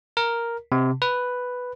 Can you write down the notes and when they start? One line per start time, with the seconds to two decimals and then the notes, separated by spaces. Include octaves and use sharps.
0.17 A#4
0.72 C3
1.02 B4